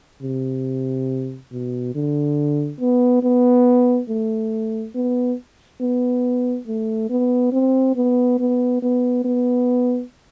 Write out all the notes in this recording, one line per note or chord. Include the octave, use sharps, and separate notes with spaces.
C3
B2
D3
B3
B3
A3
B3
B3
A3
B3
C4
B3
B3
B3
B3